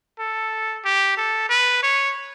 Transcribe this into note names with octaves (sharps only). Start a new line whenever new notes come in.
A4
G4
A4
B4
C#5